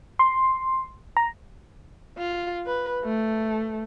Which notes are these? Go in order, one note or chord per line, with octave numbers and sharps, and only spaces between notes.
C6
A#5
F4
B4
A3